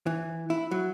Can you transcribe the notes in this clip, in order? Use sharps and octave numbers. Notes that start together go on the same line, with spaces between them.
E3
E4
F#3